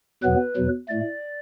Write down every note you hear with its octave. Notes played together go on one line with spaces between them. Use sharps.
E2 B2 F#3 B3 B4
E2 B2 F#3
A2 A3 D5